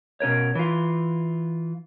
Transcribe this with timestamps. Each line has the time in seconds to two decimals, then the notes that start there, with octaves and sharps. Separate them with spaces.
0.20 B2 C#4 A#4 C#5
0.55 E3 F4